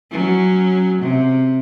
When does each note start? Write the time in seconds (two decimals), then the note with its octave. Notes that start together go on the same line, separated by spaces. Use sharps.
0.11 F#3 C#4
1.02 C3